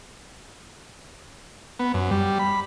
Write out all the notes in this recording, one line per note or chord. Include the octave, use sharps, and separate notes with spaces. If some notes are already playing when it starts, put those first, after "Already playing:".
B3
F#2
G3
B5